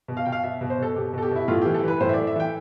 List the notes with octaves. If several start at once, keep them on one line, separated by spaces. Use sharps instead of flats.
B2
F5
B2 G5
F5
B2 E5
B2
C5
B2 A4
B2 G4
B2 A4
G4
B2 E4
A2 F4
E3 G4
A4
E3 B4
A2 C5
E5
A2 D5
E5
E3 G5